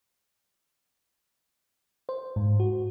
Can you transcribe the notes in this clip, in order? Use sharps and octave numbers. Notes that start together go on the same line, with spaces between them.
C5
G#2
F#4